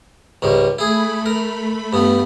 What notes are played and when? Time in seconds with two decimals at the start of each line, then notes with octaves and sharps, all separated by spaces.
0.42 C#2 G#2 G3
0.79 A3 E4 G#4 B5
1.26 A#4
1.93 G2 B3